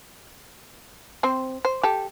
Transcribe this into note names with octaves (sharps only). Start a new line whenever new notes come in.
C4 C5
C5
G4 A4